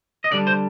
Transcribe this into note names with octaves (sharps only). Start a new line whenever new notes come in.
D#5
D3 G3 D4 D5
C5